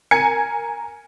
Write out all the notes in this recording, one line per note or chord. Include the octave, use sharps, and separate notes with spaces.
A#4 G#5 G#6 C#7